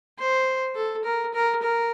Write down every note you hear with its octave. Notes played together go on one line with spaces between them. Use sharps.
C5
A4
A#4
A#4
A#4